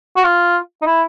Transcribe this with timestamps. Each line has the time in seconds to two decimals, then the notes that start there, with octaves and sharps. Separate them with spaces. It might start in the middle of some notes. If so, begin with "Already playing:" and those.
0.16 F#4
0.24 F4
0.82 D#4
0.86 E4